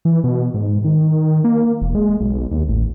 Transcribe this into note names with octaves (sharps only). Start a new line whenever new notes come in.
E3
B2
G#2
D#3
A#3
E1
G#3
B1
D#2
A1